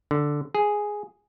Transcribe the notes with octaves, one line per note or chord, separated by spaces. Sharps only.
D3
G#4